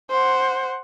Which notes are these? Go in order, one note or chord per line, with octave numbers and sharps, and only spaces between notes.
C5 F#5